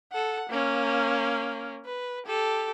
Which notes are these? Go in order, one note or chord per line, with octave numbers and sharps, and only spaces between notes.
A4 F#5
A#3 C#4
B4
G4 A4